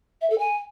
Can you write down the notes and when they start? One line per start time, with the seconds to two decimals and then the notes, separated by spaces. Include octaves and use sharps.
0.21 E5
0.30 A4
0.39 G#5